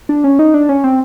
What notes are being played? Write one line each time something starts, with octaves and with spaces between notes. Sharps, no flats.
D4
C#4
D#4
D4
C#4
C4